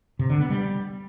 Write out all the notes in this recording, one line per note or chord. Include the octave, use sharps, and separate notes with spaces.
C3
D3
B3
G3